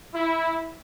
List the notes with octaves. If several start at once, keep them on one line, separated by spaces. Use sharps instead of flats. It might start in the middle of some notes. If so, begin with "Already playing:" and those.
E4